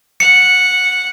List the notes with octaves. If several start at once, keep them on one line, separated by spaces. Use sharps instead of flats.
F#5 C#7